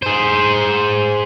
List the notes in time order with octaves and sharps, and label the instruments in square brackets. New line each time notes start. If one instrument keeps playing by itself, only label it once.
[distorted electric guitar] G#4 C5